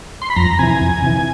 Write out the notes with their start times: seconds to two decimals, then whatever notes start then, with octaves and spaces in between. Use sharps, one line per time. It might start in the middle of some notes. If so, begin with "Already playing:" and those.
0.22 C6
0.30 B5
0.36 F2 A#5
0.59 C3 E3 G#5
0.81 F2
1.02 C3 E3